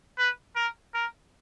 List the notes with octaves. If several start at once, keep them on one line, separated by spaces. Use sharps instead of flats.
B4
A#4
A#4